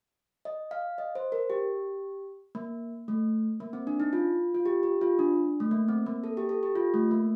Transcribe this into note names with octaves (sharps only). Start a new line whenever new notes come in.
D#5
F5
D#5
C5
A#4
G4
A#3
A3
A#3
C4
D4
D#4
F4
F4
G4
G4
F4
D4
A3
A#3
C4
A#3
A4
G4
A4
G4
F4
A3
A#3